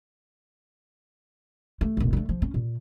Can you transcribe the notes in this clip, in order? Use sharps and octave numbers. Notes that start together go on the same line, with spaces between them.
A3
F1 A#1
D3 A3
F3
C#4
A#2